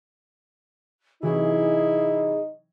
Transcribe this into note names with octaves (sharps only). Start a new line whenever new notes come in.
C3 E3 F#3 D#4 E4 G#4